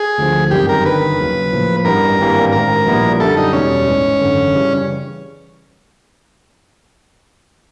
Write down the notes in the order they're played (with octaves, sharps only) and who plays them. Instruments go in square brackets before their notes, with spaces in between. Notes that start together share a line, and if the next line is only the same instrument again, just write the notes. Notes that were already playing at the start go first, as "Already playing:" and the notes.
Already playing: [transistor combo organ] G#4
[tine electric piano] D2 D3 F3
[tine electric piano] G1 F#2 D#3 G3 C4 [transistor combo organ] G4
[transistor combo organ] A#4
[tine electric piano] G1 G2 D#3 [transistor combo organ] B4
[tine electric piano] D#2 C#3 F#3
A2 F3 A#3
[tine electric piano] A1 G2 E3 G3 B3 [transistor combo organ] A#4
[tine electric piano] G#1 G2 E3 G3 A#3
[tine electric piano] A1 G#2 D#3 [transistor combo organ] A#4
[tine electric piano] A#1 A#2 G3 B3 E4
[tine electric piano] F#2 D3 G3 [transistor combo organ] A4
[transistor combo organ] D#4
[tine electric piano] E2 B2 G3 [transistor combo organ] C#4
[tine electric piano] A1 G#2 E3 G#3
G#1 F#2 D3
C#3 E3 G3